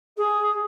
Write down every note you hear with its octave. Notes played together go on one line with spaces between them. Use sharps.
G#4